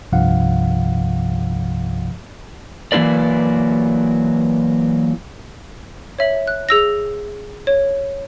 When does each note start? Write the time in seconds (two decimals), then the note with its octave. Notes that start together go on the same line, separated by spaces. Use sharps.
0.12 C2 G2 C3 F3 F5 F#5
2.92 E3 F#3 A#3 E4 B4 D5
6.19 C#5 E5 F#7
6.47 F#6
6.69 G#4 E6 A#6
7.67 C#5